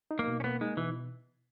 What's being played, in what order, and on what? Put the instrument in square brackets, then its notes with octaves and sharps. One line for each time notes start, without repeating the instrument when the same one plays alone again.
[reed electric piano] D#4
[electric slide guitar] A#3
[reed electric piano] B2
[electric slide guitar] C#4
[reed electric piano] A#3 [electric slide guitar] B3
[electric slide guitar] G#3 [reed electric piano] D#4
[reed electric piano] B2 [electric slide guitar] E3